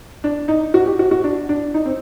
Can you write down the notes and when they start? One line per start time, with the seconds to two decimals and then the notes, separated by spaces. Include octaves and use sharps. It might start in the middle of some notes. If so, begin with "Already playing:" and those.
0.24 D4
0.48 D#4
0.74 F#4
0.86 G4
0.99 F#4
1.11 F#4
1.24 D4
1.49 D4
1.74 D#4
1.85 C4